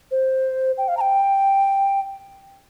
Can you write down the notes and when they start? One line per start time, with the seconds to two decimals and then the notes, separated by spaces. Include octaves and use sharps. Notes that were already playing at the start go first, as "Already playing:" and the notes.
0.11 C5
0.78 G5
0.88 F5
0.97 A#5
1.01 G5